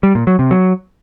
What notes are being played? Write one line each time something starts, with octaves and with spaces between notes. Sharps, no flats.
G3
A#2
F#3
C3
F#3